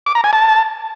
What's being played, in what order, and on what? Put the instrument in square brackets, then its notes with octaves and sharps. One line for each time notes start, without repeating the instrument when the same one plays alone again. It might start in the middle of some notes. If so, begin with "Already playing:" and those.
[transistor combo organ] D6
A#5
G#5
A5